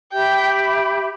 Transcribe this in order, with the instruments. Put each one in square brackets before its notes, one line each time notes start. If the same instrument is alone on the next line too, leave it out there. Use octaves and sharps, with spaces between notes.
[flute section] G4 E5 B5 [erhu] G5